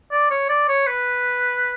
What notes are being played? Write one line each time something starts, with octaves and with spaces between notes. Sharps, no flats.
D5
C#5
D5
C#5
B4